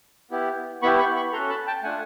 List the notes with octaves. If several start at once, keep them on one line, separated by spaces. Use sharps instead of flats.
B3 E4 G4
B3 E4 G4 B5 C#6
B5 C#6
B5 C#6
C#4 F#4 A4 A#5 C6
A5 B5
G5 A5
A3 D4 F4 F#5 G#5